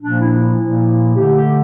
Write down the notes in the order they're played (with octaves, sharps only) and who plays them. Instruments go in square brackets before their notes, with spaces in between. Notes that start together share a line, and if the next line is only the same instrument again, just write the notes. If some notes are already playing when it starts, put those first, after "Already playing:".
[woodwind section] A#2 F3 A#3 D4
E4
E4
A#2 F3 A#3
D3 A3 G4
G4